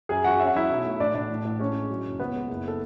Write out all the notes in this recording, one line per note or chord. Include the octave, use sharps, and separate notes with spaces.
F#2 G#4 G#5
F#2 F#4 F#5
C#4 E5
F#5
F#3 E4 E5
B1
A3
A2 D4 D5
A2 D4 D5
A2
A1
G#3 C#4 C#5
G#3
F#3
F#1
C#2 B3 B4
G#3
F#1
A4